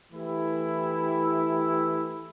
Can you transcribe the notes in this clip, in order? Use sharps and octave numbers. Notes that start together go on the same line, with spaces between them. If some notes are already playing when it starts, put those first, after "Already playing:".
E3 A3 E4 G4